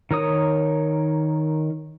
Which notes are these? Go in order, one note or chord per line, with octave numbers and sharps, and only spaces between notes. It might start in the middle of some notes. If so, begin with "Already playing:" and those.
D#3 A#4 C#5 D#6